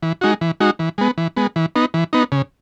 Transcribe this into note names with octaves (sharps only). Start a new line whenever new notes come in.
E3
G#3 D#4 F#4
E3
G#3 D#4 F#4
E3
G#3 B3
E3
G#3 B3
E3
B3 D#4
E3
B3 D#4
C#3